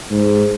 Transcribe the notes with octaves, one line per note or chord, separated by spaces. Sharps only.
G#2